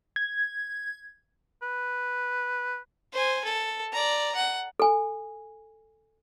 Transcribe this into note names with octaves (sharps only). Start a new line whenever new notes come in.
G#6
B4
C5 G#5
A4
D5 A#5
F#5
A4 G#5